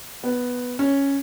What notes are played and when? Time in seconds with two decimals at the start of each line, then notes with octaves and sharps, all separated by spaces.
0.24 B3
0.79 C#4